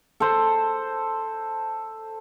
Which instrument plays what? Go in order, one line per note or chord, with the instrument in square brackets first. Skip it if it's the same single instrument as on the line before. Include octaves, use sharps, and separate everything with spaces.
[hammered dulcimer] A4 C5